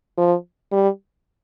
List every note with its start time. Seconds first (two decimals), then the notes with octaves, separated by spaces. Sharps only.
0.18 F3
0.72 G3